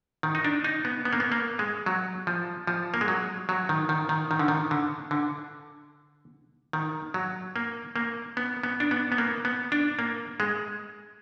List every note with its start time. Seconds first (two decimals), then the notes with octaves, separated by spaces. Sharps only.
0.23 D#3
0.35 D#4
0.44 D4
0.64 D#4
0.85 B3
1.05 B3
1.13 A#3
1.20 B3
1.32 A#3
1.59 G#3
1.86 F#3
2.27 F3
2.67 F3
2.94 A#3
3.01 G#3
3.08 F#3
3.49 F#3
3.69 D#3
3.89 D#3
4.09 D#3
4.31 D#3
4.39 D3
4.48 D#3
4.71 D3
5.11 D3
6.73 D#3
7.14 F#3
7.56 A#3
7.96 A#3
8.37 B3
8.63 B3
8.80 D4
8.91 B3
9.12 B3
9.18 A#3
9.45 B3
9.72 D4
9.99 A#3
10.40 G#3